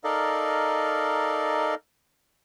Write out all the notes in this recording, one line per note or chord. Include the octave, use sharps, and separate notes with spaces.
D#4 A4 A#4 D5 D#5 F5